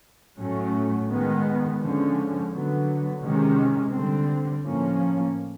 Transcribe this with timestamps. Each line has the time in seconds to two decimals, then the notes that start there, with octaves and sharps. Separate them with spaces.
0.38 A2 F#3 A3 C#4
1.10 D#3 G#3 B3
1.80 D3 F3 G#3 C#4
2.52 D3 F#3 B3
3.22 C3 D#3 G#3 C#4
3.93 D3 G3 C4
4.64 A2 F3 A#3 C#4